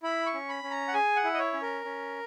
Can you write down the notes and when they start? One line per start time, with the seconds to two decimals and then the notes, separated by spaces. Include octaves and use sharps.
0.03 E4 B5
0.26 C#6
0.34 C#4
0.49 B5
0.63 C#4
0.71 A#5
0.88 F#5
0.94 G#4 G#5
1.16 F#5
1.24 E4
1.34 D#5
1.38 C#5
1.53 C#4
1.62 A#4
1.85 C#4